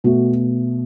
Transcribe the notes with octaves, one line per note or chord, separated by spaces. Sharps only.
B2 A3 F#4